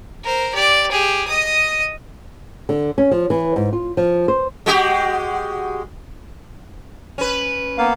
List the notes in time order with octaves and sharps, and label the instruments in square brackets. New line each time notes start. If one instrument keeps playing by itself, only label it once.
[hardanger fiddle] A#4 C5
G4 D5
G4 G#4
D#5 D#6
[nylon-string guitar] D3
C#4
F3
E3
G#2
F4
F3
C5
[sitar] G#3 F#4 G4
C#4 B4
[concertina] A#3 B3 F5